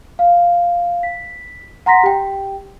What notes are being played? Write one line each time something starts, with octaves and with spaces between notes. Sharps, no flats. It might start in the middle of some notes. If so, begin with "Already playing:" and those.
F5
B6
F#5 A#5 C6 A#6 B6
G4 G5